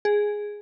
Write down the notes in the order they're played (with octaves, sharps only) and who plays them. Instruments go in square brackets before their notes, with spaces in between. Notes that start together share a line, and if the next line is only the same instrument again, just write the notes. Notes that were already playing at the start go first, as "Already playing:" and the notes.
[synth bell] G#4